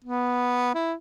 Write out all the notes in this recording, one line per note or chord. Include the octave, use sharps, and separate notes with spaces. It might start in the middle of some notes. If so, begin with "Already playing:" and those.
B3
E4